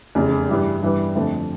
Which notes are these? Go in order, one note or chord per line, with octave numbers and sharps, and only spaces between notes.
F1 E2 C#3
G2 E3 G3
G2 E3 G3 B3
F2 D3 F3 A3 C4